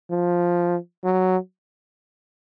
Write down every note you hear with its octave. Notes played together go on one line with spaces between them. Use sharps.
F3
F#3